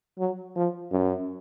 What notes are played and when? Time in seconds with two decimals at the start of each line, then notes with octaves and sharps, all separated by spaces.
0.19 F#3
0.56 F3
0.92 F#2